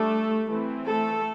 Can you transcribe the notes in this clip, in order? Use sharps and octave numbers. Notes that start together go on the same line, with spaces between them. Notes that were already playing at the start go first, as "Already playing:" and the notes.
Already playing: G3 A3 D4 A4
E3 A3 C4
A3 A4